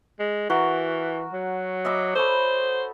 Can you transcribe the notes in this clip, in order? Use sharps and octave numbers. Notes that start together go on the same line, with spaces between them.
G#3
E3 F#4 A#4
F#3
D#5 E5 D6
A4 C5 C#5 B5